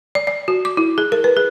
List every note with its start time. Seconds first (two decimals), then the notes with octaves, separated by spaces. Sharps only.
0.15 D5
0.27 D5
0.48 F#4
0.65 D6
0.77 E4
0.98 G#4
1.12 A#4
1.24 B4
1.37 G#4